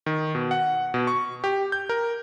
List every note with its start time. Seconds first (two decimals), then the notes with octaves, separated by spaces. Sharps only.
0.06 D#3
0.35 B2
0.51 F#5
0.94 B2
1.07 C#6
1.44 G4
1.72 G6
1.89 A#4